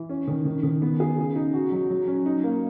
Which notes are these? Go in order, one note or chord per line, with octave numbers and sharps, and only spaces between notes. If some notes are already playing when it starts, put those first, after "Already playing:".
Already playing: E3
C#4
D#3
D#3
D#3
B3
G#4
C#3
D#4
F#4
F#3
F#3
C#4
D#4
A#3